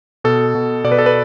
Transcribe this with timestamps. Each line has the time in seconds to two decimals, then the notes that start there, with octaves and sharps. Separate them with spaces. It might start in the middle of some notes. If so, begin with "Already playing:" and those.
0.24 B2 A4
0.55 B2
0.84 B2 D5
0.92 B4
0.98 A4
1.06 B4